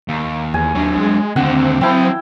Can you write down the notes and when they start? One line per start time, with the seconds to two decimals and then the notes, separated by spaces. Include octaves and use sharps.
0.09 D#2
0.54 E2 G#5
0.75 D#2 F#3 D4
0.98 G#3
1.36 D#2 D3 C4 F#5
1.81 F#3 E4 G5 A5